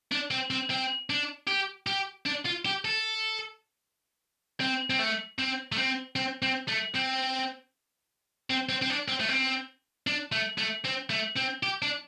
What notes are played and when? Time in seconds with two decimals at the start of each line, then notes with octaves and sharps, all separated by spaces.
0.12 D4
0.31 C4
0.51 C4
0.70 C4
1.10 D4
1.48 G4
1.87 G4
2.26 D4
2.46 F4
2.66 G4
2.85 A4
4.60 C4
4.90 C4
4.99 A3
5.39 C4
5.72 A3
5.78 C4
6.16 C4
6.42 C4
6.68 A3
6.95 C4
8.50 C4
8.69 C4
8.82 C4
8.90 D4
9.08 C4
9.20 A3
9.28 C4
10.07 D4
10.32 A3
10.58 A3
10.84 C4
11.10 A3
11.36 C4
11.63 G4
11.82 D4